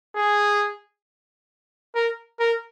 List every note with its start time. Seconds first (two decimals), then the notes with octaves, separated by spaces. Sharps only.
0.15 G#4
1.95 A#4
2.39 A#4